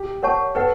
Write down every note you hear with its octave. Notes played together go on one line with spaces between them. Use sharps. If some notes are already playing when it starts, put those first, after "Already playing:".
Already playing: G4
A#4 C#5 F#5 A5 C#6
A4 B4 D#5 F#5